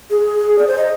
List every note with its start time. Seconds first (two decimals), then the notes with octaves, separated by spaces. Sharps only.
0.11 G#4
0.59 D5
0.67 C5
0.78 D#5